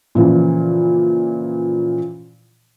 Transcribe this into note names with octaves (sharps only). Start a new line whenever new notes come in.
A#2 C#3 E3 F3